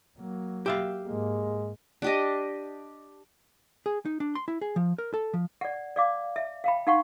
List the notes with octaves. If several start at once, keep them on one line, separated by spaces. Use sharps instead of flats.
F#3 A#3
G4 E5 F5
G#2 G#3 A#3
D4 G4 D#5
G#4
D#4
D4
C6
E4
G#4
F3
A#4
A4
F3
D5 F#5
D5 F5 D6
E5
F5 G5 B5
D#4 F5 F#5 C6 C#6